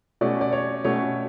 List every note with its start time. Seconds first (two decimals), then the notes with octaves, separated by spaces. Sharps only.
0.21 B2 A3 C#4 D5
0.41 D5
0.52 C#5
0.84 B2 A3 C#4 C#5